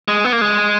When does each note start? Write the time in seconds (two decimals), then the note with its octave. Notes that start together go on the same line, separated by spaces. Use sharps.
0.08 G#3
0.25 B3
0.33 A#3
0.41 G#3